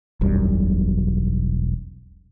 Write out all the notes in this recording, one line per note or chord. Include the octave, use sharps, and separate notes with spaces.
E1 B1 F#2 G3